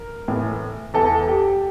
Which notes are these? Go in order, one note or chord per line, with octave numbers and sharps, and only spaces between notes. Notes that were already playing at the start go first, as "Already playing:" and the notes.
Already playing: A#4
A2 E3
E2 E3 A4
G4